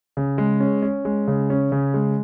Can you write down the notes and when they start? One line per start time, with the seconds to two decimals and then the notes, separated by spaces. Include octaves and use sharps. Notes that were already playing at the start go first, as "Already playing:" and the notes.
0.17 C#3
0.38 G#3
0.60 C#4
0.82 C#4
1.05 G#3
1.28 C#3
1.50 C#4
1.72 C#3
1.94 G#3